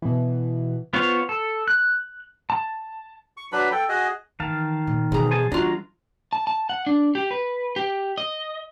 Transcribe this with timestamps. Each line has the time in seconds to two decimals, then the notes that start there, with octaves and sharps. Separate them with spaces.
0.02 B2 E3
0.93 B3 F4 C5 C#5
1.29 A4
1.68 F#6
2.50 A5
3.37 C#6
3.52 F#3 D4 B4 B5
3.72 A4 G5
3.89 F#4 G#4 D#5
4.40 D#3 E3 F5 A5
4.87 A#2
5.12 B1 B2 E3 G#4 A#5
5.31 C5 G#5 A5
5.52 E3 G3 D4 F4 F#4 A#5
6.33 A5
6.47 A5
6.70 F#5
6.87 D4
7.15 G4
7.31 B4
7.76 G4
8.18 D#5